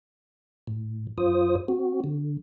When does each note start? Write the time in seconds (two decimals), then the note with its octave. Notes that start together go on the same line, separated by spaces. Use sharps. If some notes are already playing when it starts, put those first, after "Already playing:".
0.67 A2
1.18 F#2 F4 C5 D#6
1.68 C4 F#4
2.04 D3